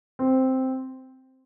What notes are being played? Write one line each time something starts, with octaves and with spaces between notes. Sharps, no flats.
C4